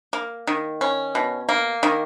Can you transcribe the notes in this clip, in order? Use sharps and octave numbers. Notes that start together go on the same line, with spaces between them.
A#3
D#3
C#4
B2
A#3
D#3